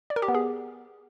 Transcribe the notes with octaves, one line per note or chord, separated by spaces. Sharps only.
D5
A#4
G4
B3
G#4